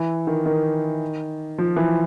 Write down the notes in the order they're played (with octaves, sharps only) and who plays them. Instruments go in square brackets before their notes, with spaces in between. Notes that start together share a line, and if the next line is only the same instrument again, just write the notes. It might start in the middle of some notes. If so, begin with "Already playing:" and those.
Already playing: [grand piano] E3
D#3
D#3
F3
E3